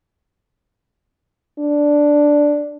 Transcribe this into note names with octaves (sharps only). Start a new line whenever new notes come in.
D4